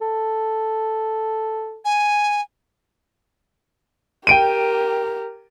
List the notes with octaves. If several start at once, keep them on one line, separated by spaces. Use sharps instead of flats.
A4
G#5
G4 A#4 G5 D7 D#7